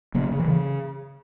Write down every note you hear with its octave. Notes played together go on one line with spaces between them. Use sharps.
C#3 F#3 A#3
C#3
E3
C#3